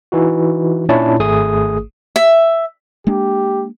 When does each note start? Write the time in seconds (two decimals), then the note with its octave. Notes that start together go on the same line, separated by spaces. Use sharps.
0.12 E3 D#4 F#4
0.89 A#2 C#4 D4 E4 C#5 A5
1.20 G#1 A3 G#4 D#6
2.16 E5
3.07 G#3 A#3 D4 G4